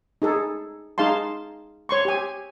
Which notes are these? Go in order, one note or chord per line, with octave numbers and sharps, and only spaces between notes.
D#4 G#4 A4
D#4 G#4 F5 A5 C6
C#5 C6 C#6
G4 G#5